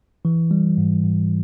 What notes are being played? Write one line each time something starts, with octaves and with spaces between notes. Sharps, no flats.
E3
G3
G#2
G#2